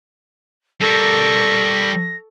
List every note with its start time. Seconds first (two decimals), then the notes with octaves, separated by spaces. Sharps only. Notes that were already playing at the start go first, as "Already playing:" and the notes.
0.81 G3 A4 A#4 C#6 A#6